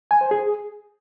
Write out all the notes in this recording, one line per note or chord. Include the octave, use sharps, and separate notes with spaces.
G#5
C5
G#4